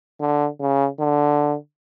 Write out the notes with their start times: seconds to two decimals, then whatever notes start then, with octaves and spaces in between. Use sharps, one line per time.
0.21 D3
0.60 C#3
1.00 D3